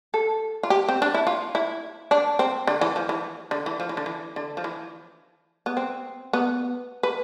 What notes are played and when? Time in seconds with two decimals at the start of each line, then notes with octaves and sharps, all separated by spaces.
0.14 A4
0.63 F4
0.70 G4
0.89 C4
1.02 D4
1.14 E4
1.27 F4
1.55 E4
2.11 D4
2.39 C4
2.67 D3
2.81 E3
2.96 F3
3.09 E3
3.51 D3
3.66 E3
3.80 F3
3.89 E3
3.97 D3
4.06 E3
4.36 D3
4.57 F3
4.64 E3
5.66 B3
5.77 C4
6.33 B3
7.03 B4